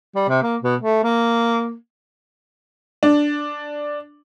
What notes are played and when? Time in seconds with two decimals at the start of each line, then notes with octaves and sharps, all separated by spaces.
0.15 G3
0.29 C3
0.43 A#3
0.62 B2
0.81 A3
1.04 A#3
3.03 D4